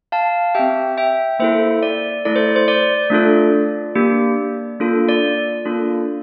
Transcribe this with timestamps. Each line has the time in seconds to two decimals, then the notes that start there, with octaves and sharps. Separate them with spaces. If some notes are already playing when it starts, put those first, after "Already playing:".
0.12 F5 A5
0.55 C4 G4 E5 G5
0.98 E5 G5
1.39 A#3 E4 A4 C5 E5
1.83 D5
2.25 A3 E4 A4 D5
2.36 C5
2.56 C5
2.68 D5
3.10 A3 D4 F4 A4
3.96 A#3 D4 G4
4.80 A#3 D4 F4 A4
5.09 D5
5.65 A#3 D4 F4 A4